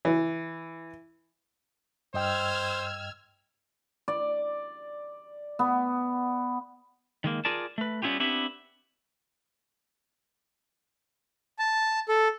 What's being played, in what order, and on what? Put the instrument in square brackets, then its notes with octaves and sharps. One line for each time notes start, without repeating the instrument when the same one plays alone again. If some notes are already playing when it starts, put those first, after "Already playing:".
[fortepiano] E3
[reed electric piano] G2 D#5 G5 [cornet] C5 [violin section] E6 F6 G#6
[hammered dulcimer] D5
B3
[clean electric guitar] D#3 G#3 A#3
F4 G#4 A#4 D5 A5
A3 B4
G3 B3 C#4 E4 F4 G4
B3 C4 D4 E4 G4 B4
[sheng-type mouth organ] A5
A4